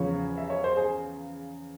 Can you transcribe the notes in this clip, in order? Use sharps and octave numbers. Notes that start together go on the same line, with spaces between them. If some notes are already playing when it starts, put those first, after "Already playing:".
Already playing: E2 C#3 F3 C#5
E5
C#5
C5
G#4